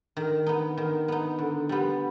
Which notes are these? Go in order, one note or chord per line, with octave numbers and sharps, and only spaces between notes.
D#3
B3 D#4
D#3
B3 D#4
D3
G3 B3